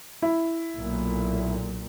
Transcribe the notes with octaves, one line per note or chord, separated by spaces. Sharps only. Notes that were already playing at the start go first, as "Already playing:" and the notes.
E4
B1 A#2